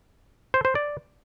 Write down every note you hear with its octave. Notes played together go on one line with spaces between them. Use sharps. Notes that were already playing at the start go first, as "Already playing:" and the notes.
C5
C5
D5